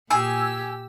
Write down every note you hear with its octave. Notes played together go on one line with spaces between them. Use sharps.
A#2 G4 G#4 G#5 E6